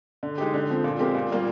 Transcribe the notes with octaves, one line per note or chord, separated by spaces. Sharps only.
D3
G#3 D#4 G4
D3
F3 C4
A#2
G#3 C4 G4 A#4
A#2
G3 A#3 F4